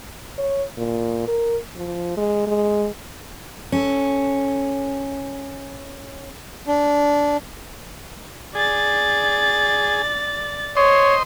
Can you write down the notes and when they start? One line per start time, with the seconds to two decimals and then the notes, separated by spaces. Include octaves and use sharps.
0.38 C#5
0.77 A#2
1.28 A#4
1.76 F3
2.17 G#3
2.47 G#3
3.72 C#4 A4
6.67 D4
8.55 G#4 D5 A6
10.77 C5 C#5 D#5 C6